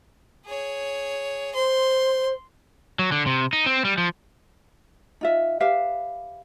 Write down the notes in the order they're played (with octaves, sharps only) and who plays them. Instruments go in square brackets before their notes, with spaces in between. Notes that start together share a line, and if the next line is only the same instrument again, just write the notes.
[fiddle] G#4 C#5
[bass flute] C5 [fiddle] C6
[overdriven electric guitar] F#3
D3
C3
D#4
C4
G3
F3
[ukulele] D#4 F4 E5
G4 B4 E5 F5